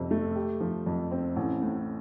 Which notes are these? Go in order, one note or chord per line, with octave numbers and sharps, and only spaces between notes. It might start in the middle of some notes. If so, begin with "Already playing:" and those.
Already playing: F2 C3 C4
A3
G4
F3
F2
C4
A1
A2